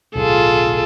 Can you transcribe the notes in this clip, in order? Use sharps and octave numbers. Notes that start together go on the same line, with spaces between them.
D1 B1 F4 G#4 A4